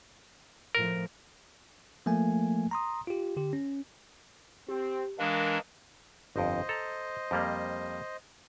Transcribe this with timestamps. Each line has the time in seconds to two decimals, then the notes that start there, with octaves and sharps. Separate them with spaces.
0.75 A2 F3 A3 A#4
2.06 F3 A3 A#3 G#5
2.71 A#5 C6 D#6
3.07 F4 G4
3.37 D3 G4
3.53 C#4
4.69 C4 G4
5.19 E3 G#3 D4 A#4 F5 D#6
6.36 G1 F2 C5 D#5
6.69 A4 A#5
7.31 F2 G3 A#3